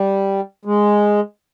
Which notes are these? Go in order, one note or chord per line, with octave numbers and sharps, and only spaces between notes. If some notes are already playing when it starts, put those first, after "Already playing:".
Already playing: G3
G#3